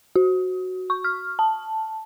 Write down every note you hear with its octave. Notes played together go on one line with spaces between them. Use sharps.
F#4
C#6
F6
A5